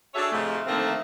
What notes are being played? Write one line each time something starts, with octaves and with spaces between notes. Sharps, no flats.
D4 F#4 G#4 A4 C#5 E5
G#2 C3 F3 G#3 A3
D3 D#3 F3 A3 A#3 C4